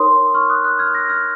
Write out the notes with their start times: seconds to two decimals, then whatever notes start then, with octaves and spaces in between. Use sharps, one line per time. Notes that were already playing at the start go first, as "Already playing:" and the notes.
Already playing: D#4 A#4 C#5 C6 D#6
0.34 C#6 F6
0.49 D#6 F#6
0.64 D#6 F#6
0.79 F6 G#6
0.94 F#6 A#6
1.09 F6 G#6